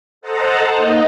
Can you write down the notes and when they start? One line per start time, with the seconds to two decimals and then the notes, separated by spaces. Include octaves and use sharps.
0.21 A4 C5 D#5 F#5 A5 A#5
0.75 A#3 D#4 D#5